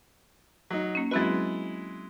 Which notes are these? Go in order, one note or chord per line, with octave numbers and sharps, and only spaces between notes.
F#3 D#4
A#3 C#4
F#3 G#3 C4 E4 F#4 B4